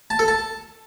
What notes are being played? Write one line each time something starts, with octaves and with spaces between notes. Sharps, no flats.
A5
A4
A5